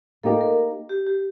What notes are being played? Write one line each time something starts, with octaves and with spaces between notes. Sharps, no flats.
A#3 D#4 G4 A4
A#4
G4
G4